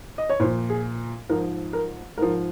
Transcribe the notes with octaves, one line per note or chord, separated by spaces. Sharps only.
D#5
C#5
A#2 F3 C5
G#4
G#2 F3 A#4
A#4
G#2 F3 A#4